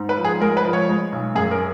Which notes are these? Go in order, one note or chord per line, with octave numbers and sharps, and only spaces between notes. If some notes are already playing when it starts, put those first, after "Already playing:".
Already playing: G#2
B4
F3
G#4
G#3 A#4
B4
F3
C#5
G#3
B1
F#2 G#4
A#4